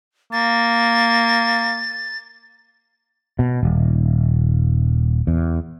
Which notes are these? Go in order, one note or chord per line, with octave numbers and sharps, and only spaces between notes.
A#3 A6
B2
D#1
E2